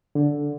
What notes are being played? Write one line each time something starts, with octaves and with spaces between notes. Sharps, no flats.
D3